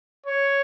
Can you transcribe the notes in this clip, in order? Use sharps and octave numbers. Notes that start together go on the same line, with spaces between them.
C#5